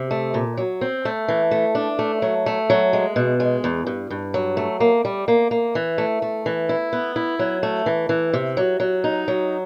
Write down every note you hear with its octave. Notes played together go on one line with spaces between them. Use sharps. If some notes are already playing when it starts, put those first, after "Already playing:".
Already playing: C3
A3
A#2
F#3
C4
A3
E3
A3
D4
A3
F#3
A3
F#3
G#3
B2
G#3
E2
G2
G2
F#3
A3
A#3
G3
A#3
A#3
E3
A3
A3
E3
E4
B3
E4
F#3
A3
E3
E3
C3
F#3
F#3
D#4
F#3